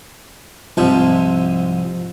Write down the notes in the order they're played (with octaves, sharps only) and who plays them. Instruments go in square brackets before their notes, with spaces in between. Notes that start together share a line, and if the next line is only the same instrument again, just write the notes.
[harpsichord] C2 G#2 C3 [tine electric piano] F3